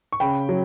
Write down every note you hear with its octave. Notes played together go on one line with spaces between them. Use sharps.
C#6
C#3 G5 B5
F#3